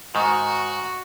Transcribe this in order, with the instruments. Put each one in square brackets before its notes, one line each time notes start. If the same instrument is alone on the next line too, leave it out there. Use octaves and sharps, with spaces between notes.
[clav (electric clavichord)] G#2 D#3 [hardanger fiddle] F#4